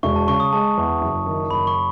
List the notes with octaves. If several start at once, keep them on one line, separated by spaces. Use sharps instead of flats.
E1 C#6
A5
C#3 C#6
D#6
G#3 A5
E2
F#1
D#3
F#1 B5
C#6